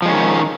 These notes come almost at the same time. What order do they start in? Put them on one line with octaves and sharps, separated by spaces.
F3 G#3 C#4 D#3